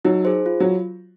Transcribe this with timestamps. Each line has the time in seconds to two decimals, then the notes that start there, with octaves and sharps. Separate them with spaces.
0.05 F#3 D#4
0.25 G#4 C5
0.46 F4
0.60 F#3